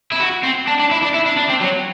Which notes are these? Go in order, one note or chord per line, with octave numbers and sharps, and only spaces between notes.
E4
F#4
C4
D4
D4
E4
D4
E4
D4
D4
C4
F#3